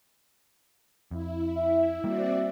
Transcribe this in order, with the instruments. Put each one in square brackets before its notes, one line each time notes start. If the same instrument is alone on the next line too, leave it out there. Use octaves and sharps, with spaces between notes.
[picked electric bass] F2 [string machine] E4
[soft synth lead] E5
[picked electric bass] G3 A#3 [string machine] C4 F#4 D5